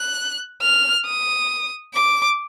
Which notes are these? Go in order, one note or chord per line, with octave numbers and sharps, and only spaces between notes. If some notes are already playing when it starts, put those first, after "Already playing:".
Already playing: F#6
F6
D#6
D6